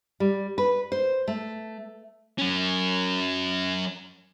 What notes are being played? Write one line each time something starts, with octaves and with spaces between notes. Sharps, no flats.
G3
B4
C5
A3
F#3 C#4